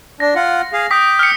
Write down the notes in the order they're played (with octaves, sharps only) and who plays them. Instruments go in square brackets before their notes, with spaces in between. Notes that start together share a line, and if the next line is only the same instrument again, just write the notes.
[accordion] D4 [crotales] A#6
[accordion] F4 F#5
G#4 F5
[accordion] G5 D6 [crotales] D#6 B6
[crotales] F6 C#7